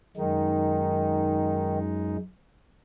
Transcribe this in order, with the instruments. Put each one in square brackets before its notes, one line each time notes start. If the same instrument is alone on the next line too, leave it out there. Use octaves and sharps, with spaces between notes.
[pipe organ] F#2 G#3 D#4 [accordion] D#3